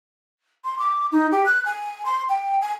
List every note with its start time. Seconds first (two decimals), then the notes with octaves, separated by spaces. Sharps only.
0.64 C6
0.79 D6
1.12 D#4
1.32 G4
1.46 F#6
1.65 G#5
2.05 C6
2.29 G5
2.62 G#5